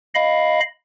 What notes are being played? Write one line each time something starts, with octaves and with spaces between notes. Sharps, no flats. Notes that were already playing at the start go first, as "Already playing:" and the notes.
D#5 F5 B5